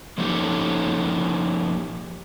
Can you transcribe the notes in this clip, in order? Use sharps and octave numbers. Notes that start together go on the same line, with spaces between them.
F3 A#3 C#4 D#4 G4 A4